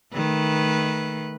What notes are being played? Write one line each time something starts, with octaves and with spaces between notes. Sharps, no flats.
D#3 A3 B4